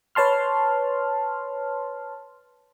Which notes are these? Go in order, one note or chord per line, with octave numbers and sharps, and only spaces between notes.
B4 C#5 A5 C6 F6